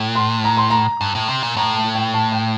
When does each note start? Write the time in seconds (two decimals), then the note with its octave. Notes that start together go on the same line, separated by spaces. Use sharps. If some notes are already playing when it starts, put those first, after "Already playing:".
Already playing: A2
0.15 C6
0.44 A#5
0.57 C6
0.70 A#5
1.01 G2
1.15 A2
1.29 C3
1.43 A#2
1.57 A2 A#5
1.76 A5
1.95 G5
2.14 A5
2.32 G5